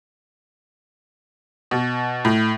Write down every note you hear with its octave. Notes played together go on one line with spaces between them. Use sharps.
B2
A2